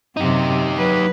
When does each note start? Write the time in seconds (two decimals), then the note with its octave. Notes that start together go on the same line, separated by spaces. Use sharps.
0.17 F#2 C3 D#4 G4
0.74 F#3 B4